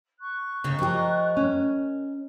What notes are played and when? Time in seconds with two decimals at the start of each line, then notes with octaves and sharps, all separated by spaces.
0.20 C#6 F#6
0.64 A#2 C#3 D#4 G5
0.79 F3 G4 A#4 D#5
1.37 C#4